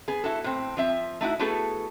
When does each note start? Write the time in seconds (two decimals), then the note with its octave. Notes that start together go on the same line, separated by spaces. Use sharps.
0.08 B3 G#4
0.24 E4 F#4 A4
0.44 A2 C4
0.77 F3 C4 E5
1.21 A3 D#4 E4 F#4
1.39 A3 B3 E4 F#4 G#4 A4